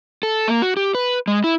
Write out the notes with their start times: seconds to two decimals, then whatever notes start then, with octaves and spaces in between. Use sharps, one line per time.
0.23 A4
0.48 A#3
0.62 F#4
0.77 G4
0.95 B4
1.27 G#3
1.44 E4